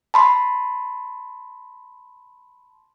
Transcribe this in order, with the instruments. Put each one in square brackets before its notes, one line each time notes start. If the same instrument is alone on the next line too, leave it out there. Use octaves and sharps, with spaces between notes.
[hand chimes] A5 B5 C6